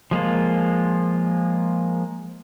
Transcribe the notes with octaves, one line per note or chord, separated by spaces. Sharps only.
F3 G#3 A#3 F4